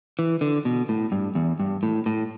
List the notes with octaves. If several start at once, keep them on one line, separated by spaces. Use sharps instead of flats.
E3
D3
B2
A2
G2
E2
G2
A2
A2